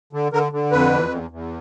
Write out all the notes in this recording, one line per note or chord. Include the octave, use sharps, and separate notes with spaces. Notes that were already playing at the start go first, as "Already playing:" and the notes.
D3
D3 A#4
D3
F2 B4
E2
E2
E2